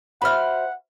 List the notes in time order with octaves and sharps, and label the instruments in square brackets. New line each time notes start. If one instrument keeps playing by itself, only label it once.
[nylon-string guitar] F#4 C5 E5 [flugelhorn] F#5 [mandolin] B5 F6